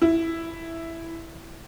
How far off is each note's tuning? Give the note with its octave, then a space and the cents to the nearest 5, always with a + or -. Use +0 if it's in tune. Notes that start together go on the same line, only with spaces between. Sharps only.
E4 +0